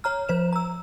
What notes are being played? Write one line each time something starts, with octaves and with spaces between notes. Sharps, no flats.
C#5 A#5 F6
F3 C5 E7
A#5 E6